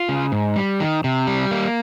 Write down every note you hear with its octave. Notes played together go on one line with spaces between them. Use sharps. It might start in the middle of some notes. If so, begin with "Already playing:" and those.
Already playing: F4
C#3
G#2
G3
D#3
C3
G3
A#3